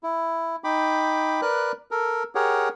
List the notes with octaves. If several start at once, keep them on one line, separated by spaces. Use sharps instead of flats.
E4
D#4 G5 B5 D6
A#4 B4 D5 F#6
A4 A#4
G4 G#4 A#4 C#5 F#5